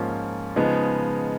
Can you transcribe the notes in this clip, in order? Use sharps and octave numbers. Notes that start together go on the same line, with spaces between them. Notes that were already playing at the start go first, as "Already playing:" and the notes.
Already playing: G#2 F3 A#3 C#4 F4
C#3 F3 G#3 B3 D#4